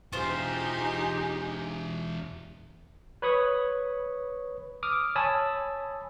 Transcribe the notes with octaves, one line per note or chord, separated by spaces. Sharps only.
E2 B2 D#4 F4 G4 G#4 C5
B4 C#5 B5 C#6 D#6
D6 D#6 F6
C#5 G#5 A5 B5 D#6 E6